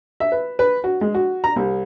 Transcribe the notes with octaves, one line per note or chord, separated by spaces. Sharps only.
E5
B4
B4
F#4
G#3
F#4
A#5
C2